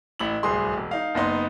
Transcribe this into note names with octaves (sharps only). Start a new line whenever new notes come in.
A1 E4 F#7
D1 C2 G#4 C6
E1
D#4 F5
F#1 B3 D#4 C6